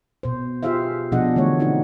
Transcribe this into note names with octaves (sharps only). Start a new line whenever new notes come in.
B2 C5
F4 G4 G#4 C5 E5 F5
B2 F3 D4 G#4 D#5 F#5
D3 E3 A3 C#5
C4 D4 D#4 F#4